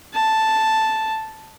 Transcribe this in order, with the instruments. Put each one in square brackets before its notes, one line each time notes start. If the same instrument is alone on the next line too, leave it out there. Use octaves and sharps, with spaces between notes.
[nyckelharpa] A5